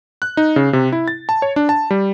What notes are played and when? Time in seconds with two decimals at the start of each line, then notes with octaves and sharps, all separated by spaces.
0.22 F#6
0.37 D#4
0.56 C#3
0.73 C3
0.92 E4
1.08 A6
1.29 A5
1.42 C#5
1.56 D4
1.69 A5
1.91 G3